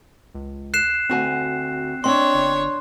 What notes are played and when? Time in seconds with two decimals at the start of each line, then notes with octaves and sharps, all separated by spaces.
0.35 C#2
0.74 F#6 C7 E7
1.10 D2 C4 F#4 G#5
2.04 C4 D4 C#5 D#5 C6
2.34 G1